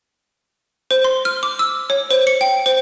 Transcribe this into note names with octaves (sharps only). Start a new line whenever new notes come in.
C5
C6
F6
D6
E6
C#5
C5
C#7
G5
C5